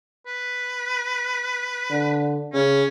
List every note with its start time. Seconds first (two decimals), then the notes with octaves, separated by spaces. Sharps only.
0.27 B4
1.91 D3
2.54 C#3 C#4